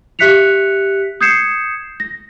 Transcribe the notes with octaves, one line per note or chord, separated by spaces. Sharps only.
G4 E5 F#6 B6 C#7 F7
D#6 G6 G#6 C7 C#7 E7
A#6